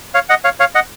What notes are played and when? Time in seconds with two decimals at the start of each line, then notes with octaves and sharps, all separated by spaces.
0.14 C#5 F5
0.29 D#5 F#5
0.44 C#5 F5
0.60 C#5 F5
0.75 D#5 F#5